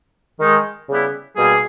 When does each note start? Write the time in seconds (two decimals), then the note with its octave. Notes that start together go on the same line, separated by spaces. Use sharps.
0.39 D#3 G#3 D#4
0.88 C#3 G3 B3 E4
1.36 B2 G3 A#3 G#4